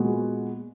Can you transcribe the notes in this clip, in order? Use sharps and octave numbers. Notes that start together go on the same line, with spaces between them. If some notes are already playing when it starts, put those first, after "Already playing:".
Already playing: A#2 G#3 B3 F#4